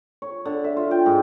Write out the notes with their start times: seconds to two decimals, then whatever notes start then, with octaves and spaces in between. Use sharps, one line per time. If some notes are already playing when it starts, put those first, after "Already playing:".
0.22 C#5
0.45 D3
0.64 E5
0.77 F4
0.91 G5
1.06 G#2